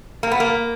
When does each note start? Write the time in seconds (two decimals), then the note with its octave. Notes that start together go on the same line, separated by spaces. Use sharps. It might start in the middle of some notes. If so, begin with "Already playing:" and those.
0.23 A#3
0.31 B3
0.40 A#3